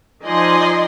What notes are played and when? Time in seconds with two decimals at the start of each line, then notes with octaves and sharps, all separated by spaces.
0.24 F3 D#4 D5 D#5 G#5 C6